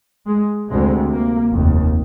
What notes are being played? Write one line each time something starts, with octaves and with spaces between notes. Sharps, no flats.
G#3
D2 C3 G#3
A#3
F1 D#2